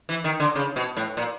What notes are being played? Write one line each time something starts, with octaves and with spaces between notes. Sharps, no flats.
E3
D#3
D3
C#3
B2
A2
A#2